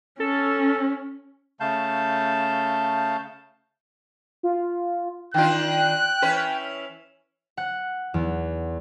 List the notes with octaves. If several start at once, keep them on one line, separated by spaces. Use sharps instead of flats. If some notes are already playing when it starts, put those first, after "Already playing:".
C#4 A4
C#3 A3 F5 A5 G6
F4
D#3 D4 F4 G5 F#6
E3 C#4 B4
F#5
E2